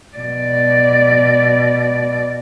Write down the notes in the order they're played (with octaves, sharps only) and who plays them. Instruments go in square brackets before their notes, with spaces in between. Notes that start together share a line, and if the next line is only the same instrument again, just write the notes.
[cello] B2 D5